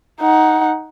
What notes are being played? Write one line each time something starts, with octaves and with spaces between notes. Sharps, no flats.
D#4 F#5